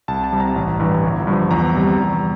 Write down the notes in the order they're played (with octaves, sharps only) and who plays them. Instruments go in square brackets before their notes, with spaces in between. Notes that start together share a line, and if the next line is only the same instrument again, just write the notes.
[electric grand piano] C2 A5
A5
C3 G3
A#5
A1
G2 E3 G3
G1
G2 F3
E2 A#5
C3 G3
E2